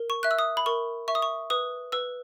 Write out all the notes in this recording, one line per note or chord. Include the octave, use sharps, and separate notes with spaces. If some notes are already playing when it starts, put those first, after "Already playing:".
Already playing: A#4
C#6
E5 F#6
E6
D#6
B5
A#4 C#6
E5 C#6
D#6
C#6
B4 D#6
B4 E6